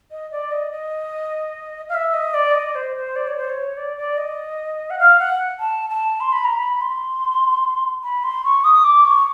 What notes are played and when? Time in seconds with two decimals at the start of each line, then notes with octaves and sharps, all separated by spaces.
0.11 D#5
0.31 D5
0.52 D#5
0.72 D#5
1.89 F5
1.94 E5
2.14 D#5
2.34 D5
2.55 D#5
2.75 C5
2.96 C5
3.16 D5
3.27 C#5
3.37 C5
3.49 C#5
3.77 D5
3.97 D5
4.17 D#5
4.90 F#5
4.99 F5
5.19 F#5
5.60 A5
5.90 A5
6.20 C6
6.33 B5
6.45 A#5
6.57 B5
6.81 C6
8.03 B5
8.24 C6
8.44 C#6
8.64 D#6
8.84 D6
9.05 C#6